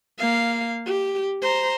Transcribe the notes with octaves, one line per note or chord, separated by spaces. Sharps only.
A#3 F5
G4
C5 A#5